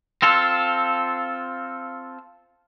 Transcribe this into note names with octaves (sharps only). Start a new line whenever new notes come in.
C4 F4 A4